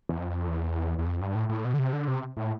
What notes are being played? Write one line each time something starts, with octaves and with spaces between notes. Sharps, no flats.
E2
F2
E2
E2
F2
G2
A2
A2
B2
D3
C3
D3
C3
A2